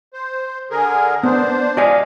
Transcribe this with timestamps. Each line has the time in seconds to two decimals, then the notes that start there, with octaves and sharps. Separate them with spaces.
0.13 C5
0.70 D3 G#4 A#4
1.23 B3 D4 C5
1.77 D5 D#5 F5 G#5